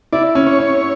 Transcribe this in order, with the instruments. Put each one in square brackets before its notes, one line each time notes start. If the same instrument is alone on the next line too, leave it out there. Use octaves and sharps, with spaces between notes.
[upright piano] E4 [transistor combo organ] D5
[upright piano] C#4
[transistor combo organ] C#5
[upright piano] C#4